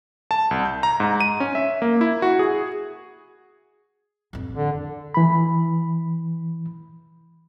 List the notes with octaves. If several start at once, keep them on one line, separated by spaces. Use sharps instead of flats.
A5
C2
G6
A#5
G#2
D#7
C#4
E5
A#3
E4
F#4
G#4
A1 F2
D3
E3 B5